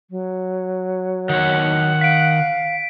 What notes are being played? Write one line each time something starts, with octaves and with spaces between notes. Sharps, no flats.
F#3
D#3 C#5 F#5
F5 B6 D7